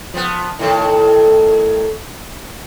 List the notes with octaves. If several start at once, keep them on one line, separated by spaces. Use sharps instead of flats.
F3 B3
A2 D#3 A4